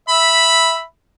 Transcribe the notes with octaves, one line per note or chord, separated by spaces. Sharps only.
E5 B5